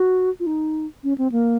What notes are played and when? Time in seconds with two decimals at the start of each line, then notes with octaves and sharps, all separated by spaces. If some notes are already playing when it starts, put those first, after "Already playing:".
Already playing: F#4
0.40 F4
0.46 D#4
1.04 C#4
1.18 C4
1.32 A#3